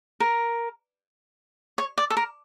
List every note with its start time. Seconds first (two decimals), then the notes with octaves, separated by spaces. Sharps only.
0.20 A#4
1.78 C#5
1.98 D5
2.10 A4
2.17 A#4